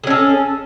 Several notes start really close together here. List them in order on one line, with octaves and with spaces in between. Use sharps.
G#4 C#4 A4